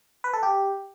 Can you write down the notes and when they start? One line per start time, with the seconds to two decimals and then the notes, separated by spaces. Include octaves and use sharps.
0.24 B4
0.33 A4
0.43 G4